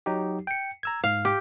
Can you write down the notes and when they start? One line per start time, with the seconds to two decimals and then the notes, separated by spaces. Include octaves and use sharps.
0.06 F#3 D#4 G4
0.47 G5 C#7
0.83 A#5 E6 G#6
1.04 G#2 F5
1.25 G4